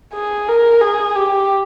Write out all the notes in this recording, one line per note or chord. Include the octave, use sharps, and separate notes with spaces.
G#4
A#4
G#4
G4